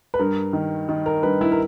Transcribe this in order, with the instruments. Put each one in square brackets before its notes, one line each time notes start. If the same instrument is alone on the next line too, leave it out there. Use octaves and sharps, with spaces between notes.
[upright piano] B4
G2 A#4
D#3
D#3
A#4
G2 B4
E4
A#4